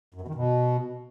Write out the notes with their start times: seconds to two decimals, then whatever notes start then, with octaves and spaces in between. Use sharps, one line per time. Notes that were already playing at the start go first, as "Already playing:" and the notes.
0.14 F#2
0.21 B2
0.28 D#3
0.35 B2